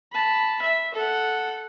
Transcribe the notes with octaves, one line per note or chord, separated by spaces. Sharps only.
A5 B5
E5
A4 F#5